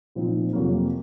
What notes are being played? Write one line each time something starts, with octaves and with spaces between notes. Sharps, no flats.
A#2 F3 C4 D#4
F2 C3 F#3 A#3